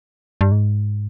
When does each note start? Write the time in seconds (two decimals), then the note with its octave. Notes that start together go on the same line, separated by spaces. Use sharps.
0.41 G2
0.52 G#2